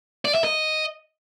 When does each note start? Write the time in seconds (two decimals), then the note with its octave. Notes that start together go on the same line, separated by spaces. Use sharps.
0.25 D5
0.35 E5
0.44 D#5